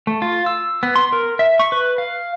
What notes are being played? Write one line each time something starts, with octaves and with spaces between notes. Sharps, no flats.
A3
F4
E6
B3
C6
A#4
E5
C#6
B4
F5